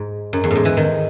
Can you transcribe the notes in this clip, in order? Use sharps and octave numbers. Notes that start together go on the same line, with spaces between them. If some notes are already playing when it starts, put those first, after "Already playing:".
Already playing: G#2
F#2
E2
A2
G#2
E3
D#3